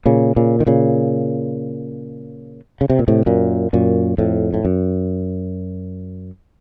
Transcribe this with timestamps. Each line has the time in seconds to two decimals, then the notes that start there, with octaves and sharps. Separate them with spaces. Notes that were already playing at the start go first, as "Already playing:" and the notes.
0.06 A#2 C#3
0.36 A#2 C#3
0.60 D#3
0.67 A#2 C#3
2.81 C#3
2.90 C3
2.99 A#2
3.08 A2 C3
3.26 F#2 A#2
3.73 F#2 A#2
4.18 F2 A2
4.54 A2
4.65 F#2